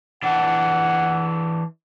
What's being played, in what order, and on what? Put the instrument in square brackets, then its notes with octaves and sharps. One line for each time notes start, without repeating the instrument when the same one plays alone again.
[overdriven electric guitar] E3 D4 [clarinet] F#5